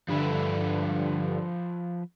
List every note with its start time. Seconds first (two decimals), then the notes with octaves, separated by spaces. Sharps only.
0.08 G2 D3 F3 B4 E5